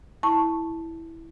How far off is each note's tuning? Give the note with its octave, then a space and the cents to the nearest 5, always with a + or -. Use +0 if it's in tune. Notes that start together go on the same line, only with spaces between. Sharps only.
E4 -5 A5 +0 C#6 +0